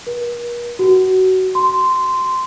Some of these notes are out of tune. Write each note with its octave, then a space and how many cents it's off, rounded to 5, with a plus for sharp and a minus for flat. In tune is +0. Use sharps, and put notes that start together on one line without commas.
A#4 +45
F#4 +20
C6 -10